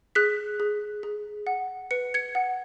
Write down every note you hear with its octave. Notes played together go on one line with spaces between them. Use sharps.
G#4 F#6 B6
G#4
G#4
F#5
B4 C#7
G#6 C#7
F#5